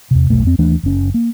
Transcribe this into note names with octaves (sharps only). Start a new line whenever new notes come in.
E2 C3
E1 B1 A3
F2 C4
D#2 E3 A3 D4
F#1 C#4
A#3